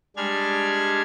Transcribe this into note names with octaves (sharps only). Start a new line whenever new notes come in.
G3 G#3 D4 F6 G#6